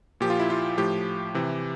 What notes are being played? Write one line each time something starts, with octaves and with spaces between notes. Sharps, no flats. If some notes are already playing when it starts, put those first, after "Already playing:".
A#2 F3 G4
F4
E4
F4
A2 F3 G4
C3 E3